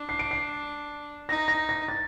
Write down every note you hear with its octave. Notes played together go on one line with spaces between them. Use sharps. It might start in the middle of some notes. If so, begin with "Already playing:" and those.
Already playing: D4
C7
D7
C7
D#4 A#6
A#6
A#6
A6